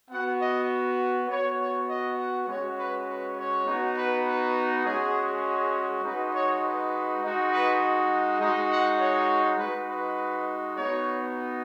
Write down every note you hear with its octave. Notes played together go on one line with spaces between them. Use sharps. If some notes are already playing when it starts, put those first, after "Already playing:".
B3 F#4 F#5
D#5
B3 F#4 C#5
C#5
D#5
F#5
G#3 C#4 F#4 C#5
B4
B4
C#5
B3 D#4 F#4
B4
B4
G#3 C#4 F#4 G#4
G#4
G#3 D#4 F#4 B4
C#5
B4
G#3 D#4 F#4
B4
G#3 D#4 F#4 D#5
F#5
C#5
G#3 D#4 F#4 B4
B4
B3 D#4 F#4 C#5